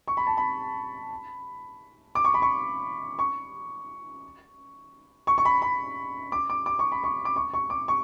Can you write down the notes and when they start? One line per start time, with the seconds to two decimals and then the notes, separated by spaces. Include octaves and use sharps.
0.08 C#6
0.17 B5
0.27 A5
0.37 B5
2.15 D6
2.24 C#6
2.34 B5
2.42 C#6
3.19 C#6
5.27 C#6
5.38 C#6
5.45 B5
5.62 B5
6.32 D6
6.50 D6
6.66 D6
6.79 C#6
6.92 B5
7.04 C#6
7.25 D6
7.36 C#6
7.54 C#6
7.70 D6
7.88 C#6